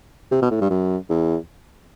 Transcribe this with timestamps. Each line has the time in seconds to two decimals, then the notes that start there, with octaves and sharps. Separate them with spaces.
0.31 C3
0.42 B2
0.51 A2
0.61 G2
0.70 F#2
1.09 E2